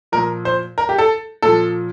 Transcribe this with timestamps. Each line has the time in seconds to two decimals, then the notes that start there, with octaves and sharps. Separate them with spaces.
0.12 A#2 F3 A#4
0.45 C5
0.78 A#4
0.89 G4
0.98 A4
1.42 A#2 F3 A4